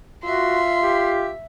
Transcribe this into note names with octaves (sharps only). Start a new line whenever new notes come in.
F4 F#4 E5 C6
G4